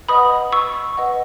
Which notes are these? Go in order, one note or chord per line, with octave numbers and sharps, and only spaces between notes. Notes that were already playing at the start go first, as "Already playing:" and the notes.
B4 D#5 F#5 B5 D#6
C#6 E6
B4 D#5 F#5